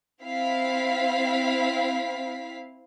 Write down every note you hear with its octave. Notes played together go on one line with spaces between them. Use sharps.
C4 E4 F5 B6